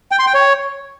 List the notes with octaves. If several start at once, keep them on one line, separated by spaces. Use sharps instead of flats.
G5
C6
G5
C#5